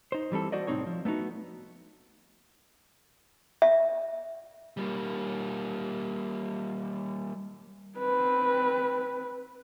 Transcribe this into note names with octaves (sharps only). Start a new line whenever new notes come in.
D#4 C5
E3 G3 C4 A4
F#4 C5 D5 D#5
C2 A2 C4 D#4 C#5
F3
A3 B3 D4 D#4 F#4
E5
G3 A#3
C4 B4